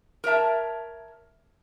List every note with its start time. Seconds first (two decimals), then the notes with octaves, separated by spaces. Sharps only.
0.24 A#4 C#5 E5 A5